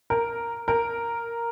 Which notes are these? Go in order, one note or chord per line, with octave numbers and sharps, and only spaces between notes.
A#4
A#4